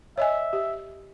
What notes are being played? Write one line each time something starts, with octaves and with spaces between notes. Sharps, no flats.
C#5 D#5 E5 G#5
G4